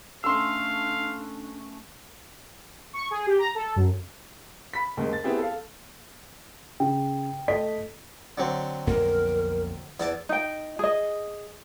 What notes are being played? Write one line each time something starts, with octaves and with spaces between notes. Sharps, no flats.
A3 C#4 D4 A4 F5 C6 E6
C#6
G#4
G4
A#5
A4
F#2
B5 B6
F#1 D#2 G#2
A6
B3 C4 E4 G4 G#4
A4 F5
C#3 G5
A3 D#5 B6
D3 F#3 C4
B1 F2 A#3 A#4
E2 D5 A5
D#4 G5
G#4 D#5